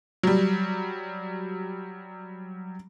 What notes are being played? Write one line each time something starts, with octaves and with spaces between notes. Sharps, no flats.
F#3 G3